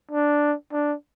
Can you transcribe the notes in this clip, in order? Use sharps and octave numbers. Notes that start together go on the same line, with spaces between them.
D4
D4